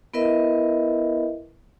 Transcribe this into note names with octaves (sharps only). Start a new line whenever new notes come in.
B3 E4 A#4 B4 D#5 E5